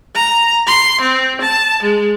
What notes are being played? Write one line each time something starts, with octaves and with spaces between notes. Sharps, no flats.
A#5
C6
C4
A5
G#3